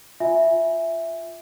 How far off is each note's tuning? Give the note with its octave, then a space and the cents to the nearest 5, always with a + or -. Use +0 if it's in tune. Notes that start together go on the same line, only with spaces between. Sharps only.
F4 +0 E5 +0 G#5 +0